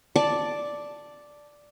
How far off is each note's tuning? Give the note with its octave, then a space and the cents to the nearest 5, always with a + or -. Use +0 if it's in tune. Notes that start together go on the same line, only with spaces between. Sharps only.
D5 +0 A5 +0